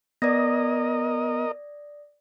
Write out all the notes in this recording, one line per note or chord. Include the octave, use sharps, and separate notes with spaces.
B3 A#4 D5 D#5 D#6 A#6